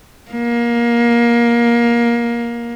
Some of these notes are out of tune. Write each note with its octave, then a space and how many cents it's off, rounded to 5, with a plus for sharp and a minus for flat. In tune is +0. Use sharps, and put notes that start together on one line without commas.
A#3 +20